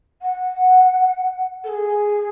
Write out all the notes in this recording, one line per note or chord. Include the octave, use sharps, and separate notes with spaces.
F#5
A4
G#4